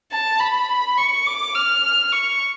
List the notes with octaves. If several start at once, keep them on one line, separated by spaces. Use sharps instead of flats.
A5
B5
C#6
D6
F6
C#6